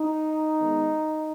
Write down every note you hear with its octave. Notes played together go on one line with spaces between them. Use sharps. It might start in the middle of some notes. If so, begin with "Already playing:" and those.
Already playing: D#4
D#3 G#3 B3